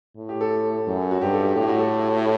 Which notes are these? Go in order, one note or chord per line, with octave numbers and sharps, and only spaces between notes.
A2
G4
A4
F#2
F#4
G2 G4
A4
G4
A2 G4
F#4
A4